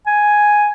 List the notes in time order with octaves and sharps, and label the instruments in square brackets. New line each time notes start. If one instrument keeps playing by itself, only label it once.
[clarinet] G#5